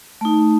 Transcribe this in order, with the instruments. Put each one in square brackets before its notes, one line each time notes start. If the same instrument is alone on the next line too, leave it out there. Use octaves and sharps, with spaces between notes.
[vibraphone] A3 D#4 A5